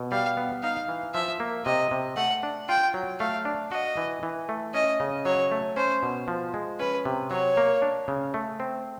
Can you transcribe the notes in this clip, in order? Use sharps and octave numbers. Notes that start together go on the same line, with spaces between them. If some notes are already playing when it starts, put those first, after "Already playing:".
Already playing: B2
G3 F5
B3
D#4 F5
E3
F3 E5
A#3
C3 D#5
C3
A3 F#5
D4
F4 G5
F#3
A3 F5
D4
F#4 D#5
E3
E3
A3
C#4 D#5
C#3
F#3 C#5
A3
C#4 C5
B2
F3
G#3
C#4 B4
C3
F#3 C#5
A#3
D4
C#3
A3
C4